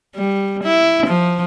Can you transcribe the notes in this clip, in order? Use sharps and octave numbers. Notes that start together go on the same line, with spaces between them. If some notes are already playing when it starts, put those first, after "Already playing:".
G3
E4
F3